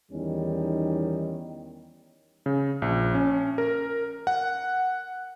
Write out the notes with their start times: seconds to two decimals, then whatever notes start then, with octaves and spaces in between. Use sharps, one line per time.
0.11 E2 D#3 G3 C#4 D#4
2.46 C#3
2.82 A#1
3.14 C#4
3.58 A#4
4.27 F#5